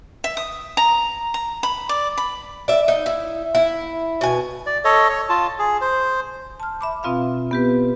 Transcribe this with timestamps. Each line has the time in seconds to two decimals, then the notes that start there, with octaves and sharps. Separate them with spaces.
0.24 E5
0.37 D#6
0.77 A#5
1.34 A#5
1.63 B5
1.89 D5
2.18 B5
2.68 D5 E5
2.88 D#4
3.06 E4
3.55 E4
4.21 B2 G#5
4.66 D5
4.85 A4 C#5 D#5
5.09 C#5
5.29 F4 A5
5.59 G#4
5.81 C5
6.60 A5 F6
6.81 E5 B5 D6
7.03 B2 C4 F4 E5 F5
7.51 B3 G4 B4